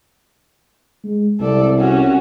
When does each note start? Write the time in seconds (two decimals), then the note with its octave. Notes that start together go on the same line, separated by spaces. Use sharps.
1.04 G#3
1.40 C2 A4 D5
1.79 C#4 F#4